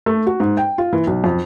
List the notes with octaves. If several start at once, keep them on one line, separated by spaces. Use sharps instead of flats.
A3
F#4
G#2
G5
F4
E3
B1
F2